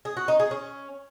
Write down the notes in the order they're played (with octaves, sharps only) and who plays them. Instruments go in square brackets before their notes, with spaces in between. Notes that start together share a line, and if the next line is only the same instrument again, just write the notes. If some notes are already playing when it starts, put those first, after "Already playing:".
[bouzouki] G#4
F#4
D#4
G#4
C#4